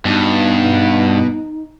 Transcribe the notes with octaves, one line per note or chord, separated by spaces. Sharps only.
G2 B2 D#4